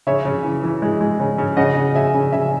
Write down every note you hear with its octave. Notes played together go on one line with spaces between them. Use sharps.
C#3 C#5 E5
C#3
E3
E3
G#3
G#3
C#3
C#3
C#3 D#5 F#5
C#3
C#3 E5 G#5
C#3
C#3 E5 G#5